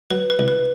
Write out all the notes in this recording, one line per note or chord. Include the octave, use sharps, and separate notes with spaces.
F#3 B4
B4
C2
B4